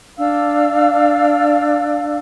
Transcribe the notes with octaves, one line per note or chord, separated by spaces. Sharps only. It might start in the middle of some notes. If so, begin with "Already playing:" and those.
D4 F5 E6